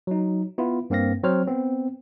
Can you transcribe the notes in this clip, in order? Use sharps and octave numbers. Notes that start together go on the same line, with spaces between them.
F#3 D#4
B3 E4 F4
G2 A#3 C4 F5 A#6
F#3 C4 C5 C#5 F6
B3 C4